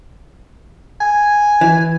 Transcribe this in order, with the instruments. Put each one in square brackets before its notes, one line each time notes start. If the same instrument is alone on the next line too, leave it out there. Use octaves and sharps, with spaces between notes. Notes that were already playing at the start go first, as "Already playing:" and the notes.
[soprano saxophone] G#5
[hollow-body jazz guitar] E3